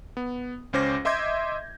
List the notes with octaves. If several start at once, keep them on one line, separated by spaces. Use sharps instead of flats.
B3
C#2 C#4 C5 D6 A#6
D#5 E5 C6 D6 G6 G#6